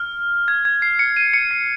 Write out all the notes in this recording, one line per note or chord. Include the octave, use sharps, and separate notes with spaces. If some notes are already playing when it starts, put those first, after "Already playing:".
Already playing: F6
G#6
G#6
C7
C#7
D#7
C#7
C7